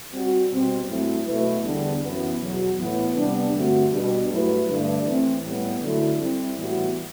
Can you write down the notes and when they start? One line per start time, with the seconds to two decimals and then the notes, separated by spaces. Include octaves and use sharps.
0.12 G3 C4 F#4
0.50 B2 G3 C4
0.88 G2 F#3 A3 C4 E4
1.26 B2 F#3 A3 E4 B4
1.63 E2 D3 G3 B3 D4
2.02 F#2 E3 B3
2.40 E2 B2 F#3
2.77 A2 E3 B3 E4 B4
3.16 C3 G3 B3 D4
3.53 G2 D3 A3 C4 F#4
3.91 B2 G3 D4 G4 B4
4.30 G2 F#3 A3 E4 B4
4.67 G2 D3 A3 D4
5.05 E3 A3 C4
5.44 A2 G3 B3
5.81 D3 F#3 A3 E4 A4
6.19 G3 C4 E4
6.58 A2 E3 G3 B3 F#4